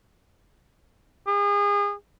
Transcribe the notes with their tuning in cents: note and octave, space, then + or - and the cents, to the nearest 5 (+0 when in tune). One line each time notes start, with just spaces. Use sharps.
G#4 -35